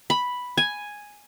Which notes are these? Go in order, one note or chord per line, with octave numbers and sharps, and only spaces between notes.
B5
G#5